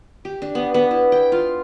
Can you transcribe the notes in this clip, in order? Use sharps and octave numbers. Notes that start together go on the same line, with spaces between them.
G4
D4
B3
B3
E4
G5
F4